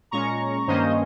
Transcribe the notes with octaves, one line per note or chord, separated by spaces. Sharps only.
A#2 G#3 C#4 A#5 C#6
G2 D#3 A#3 C#4 C5 D#5